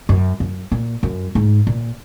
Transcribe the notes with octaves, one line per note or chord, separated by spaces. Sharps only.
F#2
F#2
A#2
F#2
G#2
A#2